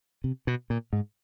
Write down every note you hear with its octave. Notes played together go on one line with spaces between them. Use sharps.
C3
B2
A#2
G#2